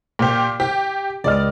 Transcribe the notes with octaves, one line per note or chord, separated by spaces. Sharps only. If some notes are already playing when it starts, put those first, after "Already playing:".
A#2 G4
G4
C#2 D5 D#5 F6